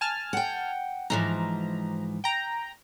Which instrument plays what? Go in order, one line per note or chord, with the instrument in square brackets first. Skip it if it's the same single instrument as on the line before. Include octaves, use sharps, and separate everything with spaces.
[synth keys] G#5 A5 F6
[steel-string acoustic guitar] F#5 G5
[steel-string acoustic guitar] G#2 E3 F3 [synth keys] A#5
[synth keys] G5 A#5